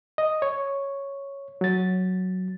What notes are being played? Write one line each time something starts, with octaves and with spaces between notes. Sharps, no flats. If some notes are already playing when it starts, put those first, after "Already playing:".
D#5
C#5
F#3 A6